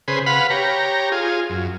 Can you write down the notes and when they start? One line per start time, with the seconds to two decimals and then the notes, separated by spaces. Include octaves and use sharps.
0.08 C#3 G#4 B4 C5
0.26 B4 F5 F#5 B5
0.50 G4 C#5 A#5
1.12 F4 G#4
1.50 F#2